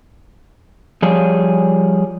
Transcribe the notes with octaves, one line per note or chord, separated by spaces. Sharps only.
F3 G3 G#4 C#5